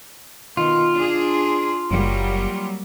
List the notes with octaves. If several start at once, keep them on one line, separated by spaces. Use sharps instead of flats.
B2 D#3 F4
D4 G#4
F#1 F#3 G3 A#3